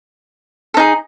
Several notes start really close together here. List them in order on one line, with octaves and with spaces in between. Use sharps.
A4 D#4 G#4